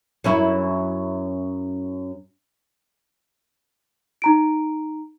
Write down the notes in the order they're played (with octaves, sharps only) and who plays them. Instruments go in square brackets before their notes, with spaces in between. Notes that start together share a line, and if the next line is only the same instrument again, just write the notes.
[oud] F#2 C#4 E4
[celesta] D#4 A#5 D7